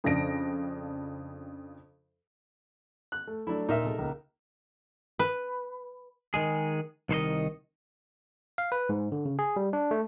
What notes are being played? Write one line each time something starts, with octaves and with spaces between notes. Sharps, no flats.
F2 C#3 D4 A#6 D7
F#6
A3
F#3 A3 D4 E4
A#2 D#4 A#4 E5
C3 G#3 A4
C#2 A#3
B4
D#3 G#3 G#4
C2 D#3 C5 D#5
F5
B4
G#2
D3
C#3
G#4
G3
D4
A3